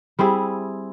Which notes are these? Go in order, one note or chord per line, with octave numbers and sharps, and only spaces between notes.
G3 C4 E4 G#4